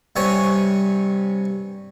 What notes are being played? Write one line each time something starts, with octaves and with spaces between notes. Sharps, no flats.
G2 C3 C#5 G#5